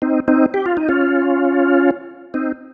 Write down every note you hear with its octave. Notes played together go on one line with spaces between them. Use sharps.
C4 D#4
C4 D#4
G4
F4
D#4
C#4 F4
C4 D#4